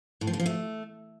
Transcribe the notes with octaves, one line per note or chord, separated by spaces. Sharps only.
A2
F3
D3
F3
A3